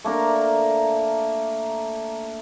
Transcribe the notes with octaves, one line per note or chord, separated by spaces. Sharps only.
A3 A#3 D4 A#4